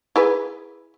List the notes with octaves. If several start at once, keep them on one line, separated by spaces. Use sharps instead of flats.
E4 G#4 B4